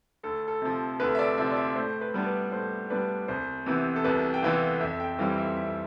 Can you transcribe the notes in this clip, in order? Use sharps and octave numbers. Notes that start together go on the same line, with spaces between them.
D2 A4
A4
C3 F3
D2 B4
E5
D5
C3 F3 E5
D5
E5
A2 C5
B4
G3 B3 D4
B4
A2 C5
G3 B3 D4 B4
C2 C5
C3 E3 B3
A4
C2 B4
G5
C3 E3 B3 F5
F2 E5
G5
E3 G3 C4 E4 F5
E5
F2 E5